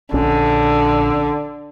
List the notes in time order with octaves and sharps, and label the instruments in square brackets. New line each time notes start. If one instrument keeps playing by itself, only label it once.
[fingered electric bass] A#1 C#4 [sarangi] D3